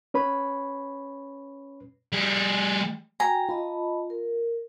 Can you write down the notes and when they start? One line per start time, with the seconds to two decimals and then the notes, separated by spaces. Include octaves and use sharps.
0.14 C#4 B4 C#5 B5
2.13 G3 G#4
3.20 F#4 G5 G#5 A#5
3.49 F4 D#5 A5 B5
4.10 A#4